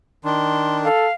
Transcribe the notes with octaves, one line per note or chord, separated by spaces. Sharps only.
D#3 D4 C6
A4 F5